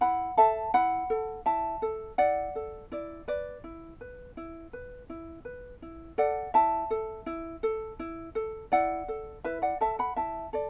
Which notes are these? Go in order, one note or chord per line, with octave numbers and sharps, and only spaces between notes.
E4 F#5 B5
A4 E5 A5
E4 F#5 B5
A4
E4 E5 A5
A4
E4 D5 F#5
A4
E4 D5
B4 D5
E4
B4
E4
B4
E4
B4
E4
A4 D5 F#5
E4 E5 A5
A4
E4
A4
E4
A4
E4 D5 F#5
A4
E4 B4 E5
D5 F#5
A4 E5 A5
F#5 B5
E4 E5 A5
A4 D5